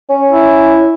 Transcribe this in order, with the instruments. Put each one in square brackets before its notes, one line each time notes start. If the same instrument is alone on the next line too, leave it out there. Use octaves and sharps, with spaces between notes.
[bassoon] C#4
[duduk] E4